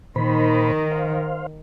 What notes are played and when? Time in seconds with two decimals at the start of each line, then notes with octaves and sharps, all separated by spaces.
0.16 A#2 D#3 C5 B5
0.91 C5 F5